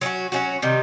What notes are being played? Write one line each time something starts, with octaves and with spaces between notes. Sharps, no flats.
F#3 A3 C#4 F#4
F#3 A3 C#4 F#4
C3 D#3 G3